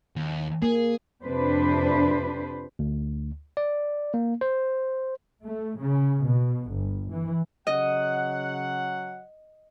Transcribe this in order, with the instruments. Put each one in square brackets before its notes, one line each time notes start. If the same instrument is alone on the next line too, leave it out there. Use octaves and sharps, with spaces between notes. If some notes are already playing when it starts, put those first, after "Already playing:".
[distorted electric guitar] D#2
[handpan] A#3 [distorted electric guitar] G#4
[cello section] F2 C3 D4 B4 C5
[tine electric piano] D2
D5
A#3
C5
[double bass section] A3
C#3
B2
G1
E3
[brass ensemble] C#3 F#3 F#5 [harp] D#5